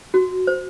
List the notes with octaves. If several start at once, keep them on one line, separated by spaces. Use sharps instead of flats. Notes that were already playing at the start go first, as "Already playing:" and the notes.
F#4
C5